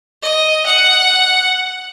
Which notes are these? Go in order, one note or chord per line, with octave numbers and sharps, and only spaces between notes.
D#5
F#5